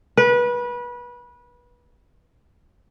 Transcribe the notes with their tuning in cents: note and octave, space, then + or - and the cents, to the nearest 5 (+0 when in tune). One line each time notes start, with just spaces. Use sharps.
B4 -25